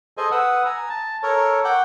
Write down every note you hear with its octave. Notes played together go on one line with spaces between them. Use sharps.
G#4 A4 C5 D#5 G#5
B4 F#5 D#6 E6
G#5 A#5
A5
A4 A#4 C#5
F#5 G5 D6